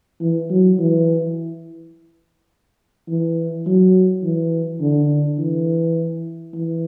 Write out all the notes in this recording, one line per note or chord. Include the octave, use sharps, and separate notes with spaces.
E3
F#3
E3
E3
F#3
E3
D3
E3
E3